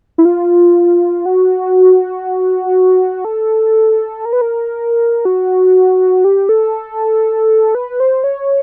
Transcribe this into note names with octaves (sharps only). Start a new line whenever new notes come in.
E4
F4
F#4
A4
A#4
B4
A#4
F#4
G4
A4
B4
C5
C#5